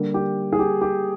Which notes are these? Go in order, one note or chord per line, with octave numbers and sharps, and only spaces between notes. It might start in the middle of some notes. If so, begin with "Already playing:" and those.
Already playing: D3 G3 A#3
G4
G#4
G4
G4